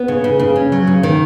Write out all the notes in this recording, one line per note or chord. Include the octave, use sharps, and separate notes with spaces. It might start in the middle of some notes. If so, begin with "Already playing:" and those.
Already playing: B3
C#3
C#3
C#3
C#4
F#3
C#3
D#3